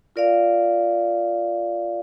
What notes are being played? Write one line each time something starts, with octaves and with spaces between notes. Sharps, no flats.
F4 A#4 D5 F5